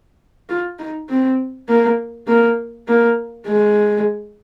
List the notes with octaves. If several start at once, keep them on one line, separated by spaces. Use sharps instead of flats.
F4
D#4
C4
A#3
A#3
A#3
G#3